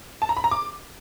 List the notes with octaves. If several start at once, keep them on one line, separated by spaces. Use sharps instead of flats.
A5
A#5
B5
A#5
D6